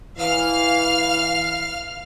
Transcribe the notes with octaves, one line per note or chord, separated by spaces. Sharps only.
E3 F5 F6